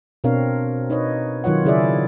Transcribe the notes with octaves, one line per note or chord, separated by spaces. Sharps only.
B2 C4 D4 A#4 C#5 F5
D#4 B4 C#5 D#5
D#3 F#3 F4 C#5 F#5
C#3 E4 G#4 C#5 D5 E5